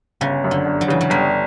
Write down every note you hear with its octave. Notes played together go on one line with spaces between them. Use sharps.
G1 C#3
F#2
D3
G1
F#3
C#3 E3
F#3
G1 G3